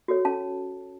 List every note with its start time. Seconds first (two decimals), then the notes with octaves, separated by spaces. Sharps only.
0.08 F#4 A4 C#5
0.25 C#4 A5